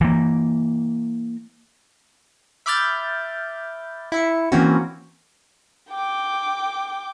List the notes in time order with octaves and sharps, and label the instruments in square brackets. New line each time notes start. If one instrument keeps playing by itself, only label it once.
[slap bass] E3 A#3
[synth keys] E5 B5 D6 F6 G6 A6
E4 E5 C#7
E3 A#3 C4 C#4 F#4
[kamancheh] G5 D6